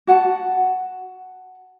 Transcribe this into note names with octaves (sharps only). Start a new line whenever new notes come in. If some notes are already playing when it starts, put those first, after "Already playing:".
F#4 F#5 G#5 A5